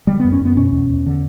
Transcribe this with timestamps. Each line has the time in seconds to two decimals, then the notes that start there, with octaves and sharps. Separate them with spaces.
0.07 D3 G3
0.20 B3
0.24 F#2
0.32 C#4
0.41 F#2 B3
0.57 B2 C#4
0.73 E2
0.90 E2
1.06 D3